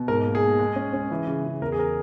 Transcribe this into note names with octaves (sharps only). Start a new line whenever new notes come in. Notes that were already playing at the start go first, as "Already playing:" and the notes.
Already playing: B2
G#2 A#4
A#3
G#4
A#3
G#3
C#4
C#4
E3
C#3
C#3
E2 A#4
G#4
A#4